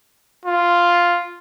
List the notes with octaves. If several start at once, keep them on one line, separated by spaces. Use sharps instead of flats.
F4